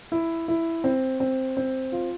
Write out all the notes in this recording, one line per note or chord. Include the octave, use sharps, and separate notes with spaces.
E4
E4
C4
C4
C4
F4